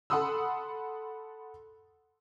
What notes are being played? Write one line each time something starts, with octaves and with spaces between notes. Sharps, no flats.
A4 F#5 B5 C6 D#6 E6